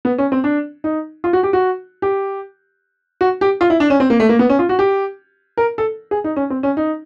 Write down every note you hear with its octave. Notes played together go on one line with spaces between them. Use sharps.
B3
C#4
C4
D4
D#4
F4
F#4
G4
F#4
G4
F#4
G4
F4
E4
D4
C#4
C4
A#3
A3
A#3
B3
C#4
F4
F#4
G4
A#4
A4
G#4
D#4
C#4
C4
C#4
D#4